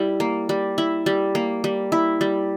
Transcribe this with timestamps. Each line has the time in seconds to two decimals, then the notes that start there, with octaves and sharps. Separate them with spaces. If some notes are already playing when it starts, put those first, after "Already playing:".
Already playing: G3 E4
0.20 A#3
0.49 G3
0.78 E4
1.06 G3
1.35 A#3
1.64 G3
1.92 E4
2.21 G3